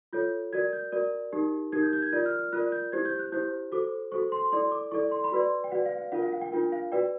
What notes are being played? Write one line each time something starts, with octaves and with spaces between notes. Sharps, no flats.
F4 A4 C#5 G6
F#4 A#4 D5 G#6
G6
F#4 A#4 D5
D#4 G4 A#4
D#4 G4 A#4 G#6
G6
G6
G#6
F4 A#4 D5 G6
F6
F6
F4 A#4 D5 F#6
G6
E4 G4 C5 G#6
G6
F#6
E4 G4 C5 G6
F#4 A4 C5 D6
F#4 A4 C5 C#6
C6
E4 A4 D5 C6
D6
E4 A4 D5 C#6
C6
B5
F#4 B4 D5 C6
G5
F#4 B4 D5 F#5
F5
F5
D4 F4 A#4 F#5
F5
F#5
G5
D4 F4 A#4 G5
F5
F#4 B4 D5 G5